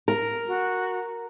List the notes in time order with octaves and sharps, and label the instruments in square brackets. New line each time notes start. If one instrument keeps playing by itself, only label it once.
[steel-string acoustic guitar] A#4
[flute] F#4